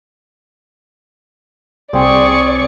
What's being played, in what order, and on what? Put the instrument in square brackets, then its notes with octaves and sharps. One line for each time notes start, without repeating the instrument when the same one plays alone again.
[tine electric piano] C2 [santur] C4 [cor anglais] G#4 [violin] D5 C#6